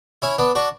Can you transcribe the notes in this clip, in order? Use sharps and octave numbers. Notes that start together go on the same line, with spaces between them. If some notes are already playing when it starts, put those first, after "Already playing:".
C#4 E4
B3 D4
D4 F#4